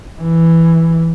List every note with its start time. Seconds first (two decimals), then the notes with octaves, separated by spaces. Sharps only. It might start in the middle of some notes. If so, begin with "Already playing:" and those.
0.21 E3